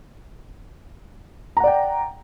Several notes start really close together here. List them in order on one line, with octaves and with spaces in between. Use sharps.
A#5 F#5 D5 G5